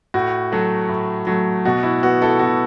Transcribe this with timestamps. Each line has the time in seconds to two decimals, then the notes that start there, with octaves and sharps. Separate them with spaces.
0.14 A2 F#4
0.52 F#3 A3
0.89 A2
1.27 F#3 A3
1.65 B2 F#4
1.83 E4
2.03 B3 F#4
2.22 E4 A4
2.39 B2 F#4